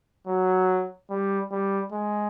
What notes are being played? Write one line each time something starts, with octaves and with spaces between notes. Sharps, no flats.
F#3
G3
G3
G#3